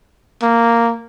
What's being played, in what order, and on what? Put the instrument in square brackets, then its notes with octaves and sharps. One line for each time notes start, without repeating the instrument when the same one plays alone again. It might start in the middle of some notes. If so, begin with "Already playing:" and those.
[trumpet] A#3